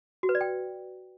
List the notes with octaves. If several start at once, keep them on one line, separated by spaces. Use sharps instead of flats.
F#4
B4
D5
G5